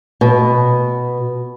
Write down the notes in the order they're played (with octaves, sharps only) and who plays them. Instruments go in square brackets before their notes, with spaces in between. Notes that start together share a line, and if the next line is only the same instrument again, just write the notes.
[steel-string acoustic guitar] B2